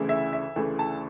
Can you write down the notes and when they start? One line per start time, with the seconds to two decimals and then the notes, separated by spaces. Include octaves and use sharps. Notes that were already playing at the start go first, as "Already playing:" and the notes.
Already playing: D2 C#3 E3 A3 E4
0.09 E5
0.33 E5
0.56 D2 C#3 E3 A3 E4
0.79 A5